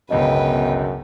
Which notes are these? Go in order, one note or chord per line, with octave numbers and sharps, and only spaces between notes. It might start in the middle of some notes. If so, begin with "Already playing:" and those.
G1 C#2 F#2 B2 B4 D#5 G5